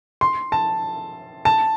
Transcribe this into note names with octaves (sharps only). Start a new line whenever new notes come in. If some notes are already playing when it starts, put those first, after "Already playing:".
C6
A5
A5